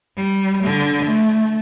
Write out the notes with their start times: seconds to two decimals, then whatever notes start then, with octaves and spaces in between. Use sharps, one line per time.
0.17 G3
0.64 D3
1.05 A3